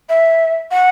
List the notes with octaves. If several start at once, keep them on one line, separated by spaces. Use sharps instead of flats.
E5
F#5